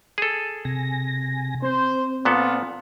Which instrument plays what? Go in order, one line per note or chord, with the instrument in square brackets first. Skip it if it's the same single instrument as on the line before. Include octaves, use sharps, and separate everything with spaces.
[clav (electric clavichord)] G#4 A4
[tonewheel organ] C3 G#5 A#6
[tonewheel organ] C4 [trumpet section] C5
[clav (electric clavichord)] A#2 B3 A4 [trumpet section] D4 F4 F#5